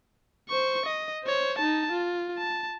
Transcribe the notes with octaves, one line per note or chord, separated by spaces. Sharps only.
C5 C#6
D#5
C5 C#5
D#4 A5
F4
A5